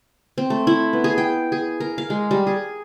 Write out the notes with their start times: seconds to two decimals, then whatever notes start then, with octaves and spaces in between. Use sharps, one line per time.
0.38 C4
0.50 A3
0.67 E4
0.93 B3
1.04 G#4
1.18 G5
1.52 G#4
1.80 A#4
1.98 F5
2.10 G#3
2.31 G3
2.47 G#4